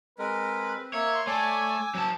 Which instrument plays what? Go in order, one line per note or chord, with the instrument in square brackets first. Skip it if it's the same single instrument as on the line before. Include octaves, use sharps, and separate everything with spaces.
[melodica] G#3 A#4 [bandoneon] C4 [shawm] B4
[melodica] A#3 E5 [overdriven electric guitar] C#5
[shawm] C6
[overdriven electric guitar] A3 [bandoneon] C#5 D5 [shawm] G#5 [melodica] D6 E6
[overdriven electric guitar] F#3 A5 [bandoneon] C#4 F#4